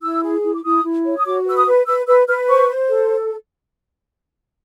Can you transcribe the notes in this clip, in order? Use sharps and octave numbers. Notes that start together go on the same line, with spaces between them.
E4 E6
G#4
E4
D6
E4 D#6
E4
C#5
D#6
F#4 D6
B4 E6
D#6
B4
B4 E6
B4 E6
B4 F6
C5 C#6
C5
A4